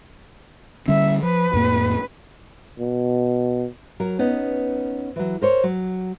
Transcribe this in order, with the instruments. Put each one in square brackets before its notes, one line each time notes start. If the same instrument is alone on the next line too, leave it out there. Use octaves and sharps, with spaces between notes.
[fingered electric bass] D3 G3 C#4 [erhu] E5
[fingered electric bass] F3 [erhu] B4
[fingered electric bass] F2 A2 A#3
[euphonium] B2
[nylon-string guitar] F#3 A#4
B3 C#4 D#4
E3 F#3
A#4 C5 C#5
F#3